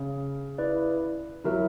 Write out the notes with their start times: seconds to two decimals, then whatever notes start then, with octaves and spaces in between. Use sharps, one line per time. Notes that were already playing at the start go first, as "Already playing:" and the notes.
Already playing: C#3
0.58 E4 B4 D5
1.45 F#3 E4 A#4 E5